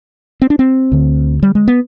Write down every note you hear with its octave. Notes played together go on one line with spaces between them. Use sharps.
C4
D4
C4
D2 D3
G3
G#3
B3